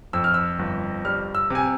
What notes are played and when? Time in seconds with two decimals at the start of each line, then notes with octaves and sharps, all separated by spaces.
0.13 F2 E6
0.24 F6
0.34 E6
0.59 G1
1.05 G3 F6
1.35 E6
1.50 C3 G#5